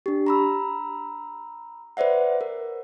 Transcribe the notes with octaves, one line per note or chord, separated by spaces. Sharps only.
D4 G4
A#5 B5 E6
B4 C5 D5 E5 F#5
A#4